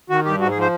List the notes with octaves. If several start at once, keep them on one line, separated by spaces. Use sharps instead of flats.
D#3 F#4
G2 G4
G#2 F#4
G#4
F3 C5